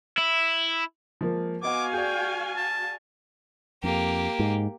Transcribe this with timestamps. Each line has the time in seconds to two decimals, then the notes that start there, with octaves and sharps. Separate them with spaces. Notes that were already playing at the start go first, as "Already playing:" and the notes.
0.18 E4
1.21 F3 G#3 A#3
1.63 B3 F#4 D#5 F5 F#5 G#5 D6
1.93 G#4 D5 G5
2.56 A5
3.84 F2 A#3 G4
4.39 G#2